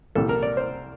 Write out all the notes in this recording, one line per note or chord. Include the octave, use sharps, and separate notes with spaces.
C2 A#2 G3 A4
A#4
D5
C5